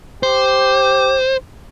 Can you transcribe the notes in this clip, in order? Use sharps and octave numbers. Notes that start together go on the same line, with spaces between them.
G4 C5